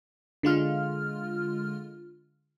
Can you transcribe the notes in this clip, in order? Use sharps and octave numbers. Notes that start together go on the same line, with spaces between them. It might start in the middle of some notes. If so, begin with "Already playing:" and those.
D3 G#3 F4 F6